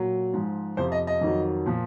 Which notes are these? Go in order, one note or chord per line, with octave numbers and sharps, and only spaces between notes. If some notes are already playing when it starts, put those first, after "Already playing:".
Already playing: A#2 F#3
G#2 F3
F2 C3 F3 C5
D#5
D#5
F2 D#3 F#3
A#2 F3